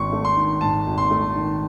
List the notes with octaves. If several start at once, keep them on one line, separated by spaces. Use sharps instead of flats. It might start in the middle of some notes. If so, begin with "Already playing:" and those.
Already playing: G#1 G#2 D#3 C6 C#6
A3
C6
D#3
G#2 A5
G#1
C6
A3
D#3